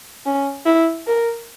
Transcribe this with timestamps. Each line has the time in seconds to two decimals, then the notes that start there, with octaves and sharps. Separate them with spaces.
0.26 C#4
0.66 E4
1.07 A#4